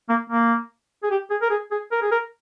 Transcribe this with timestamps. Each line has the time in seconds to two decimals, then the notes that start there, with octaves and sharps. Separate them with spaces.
0.09 A#3
0.30 A#3
1.03 G#4
1.11 G4
1.30 G#4
1.42 A#4
1.50 G#4
1.71 G#4
1.92 A#4
2.02 G#4
2.11 A#4